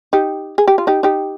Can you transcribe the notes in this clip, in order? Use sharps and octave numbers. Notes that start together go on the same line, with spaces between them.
D#4 G4
G#4
G4
F4
D#4 G4
D#4 G4